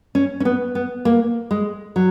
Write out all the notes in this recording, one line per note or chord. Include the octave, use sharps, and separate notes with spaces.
C#4
C#4
B3
B3
A#3
G#3
F#3